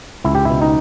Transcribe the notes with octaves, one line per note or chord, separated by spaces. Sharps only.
C#2 E4
G4
B2 E4
D#4